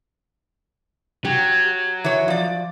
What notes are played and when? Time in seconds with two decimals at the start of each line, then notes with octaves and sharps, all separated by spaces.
1.25 F#3 G4
2.04 E3 C#5
2.28 F3 D5